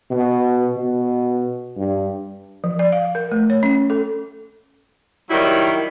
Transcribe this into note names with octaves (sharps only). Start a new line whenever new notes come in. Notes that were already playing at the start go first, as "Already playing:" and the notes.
B2
B2
G2
F3
D5
F5
A#4
A3
C#5
C#4
A4
D#3 F#3 G3 E4